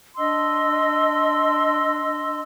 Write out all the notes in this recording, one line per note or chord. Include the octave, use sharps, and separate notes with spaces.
D4 D#5 C6 E6